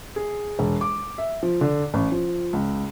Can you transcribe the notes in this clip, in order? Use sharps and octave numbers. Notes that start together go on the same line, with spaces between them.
G#4
E1
D6
E5
F3
D3
A1
F3
C#2